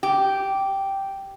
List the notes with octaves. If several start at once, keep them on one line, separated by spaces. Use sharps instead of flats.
G4